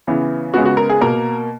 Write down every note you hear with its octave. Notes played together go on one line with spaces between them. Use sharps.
C#3 E3 B3
C#3 G#3 B3 F#4
F#4
A#4
G#4
B2 A#3 A#4